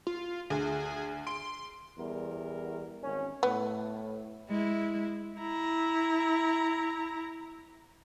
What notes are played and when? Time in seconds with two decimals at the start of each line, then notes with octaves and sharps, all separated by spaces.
0.07 F4
0.50 D2 G#4
1.27 C6 D7
1.98 E2 G3 A#4
3.04 G#1 C#4
3.43 A2 B3
4.49 G#3 E4
5.40 E4 A#5